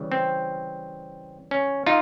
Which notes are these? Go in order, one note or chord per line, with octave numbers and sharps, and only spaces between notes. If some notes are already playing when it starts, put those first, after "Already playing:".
Already playing: C#3 E3 G3
C4
C#4
D#4 F4